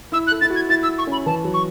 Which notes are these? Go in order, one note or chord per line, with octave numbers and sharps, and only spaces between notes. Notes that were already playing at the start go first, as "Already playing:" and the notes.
E4 E6
F#6
A4
E4 A6
F#4
G#6
E4 A6
E6
C#6
C#4 B5
E3 A5
F#3
C#6